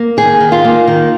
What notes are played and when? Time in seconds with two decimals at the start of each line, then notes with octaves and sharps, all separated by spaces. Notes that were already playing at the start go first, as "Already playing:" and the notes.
Already playing: A#3
0.17 D#3 G#4
0.40 D#3
0.52 F4
0.64 A#3
0.88 D#3